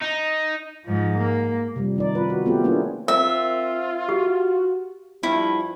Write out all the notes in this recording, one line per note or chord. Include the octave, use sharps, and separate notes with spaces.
D#4
G#2 F3
A#3
C3 F3 G3
D#3 D#4 D5
C4 F4 B4
F#4
A3 B3 C4 F4 G4
A#3 C#4 D4 E4 F4 G#4
C4 F4 A#4 E5
F#4 G4
G2 F3 E4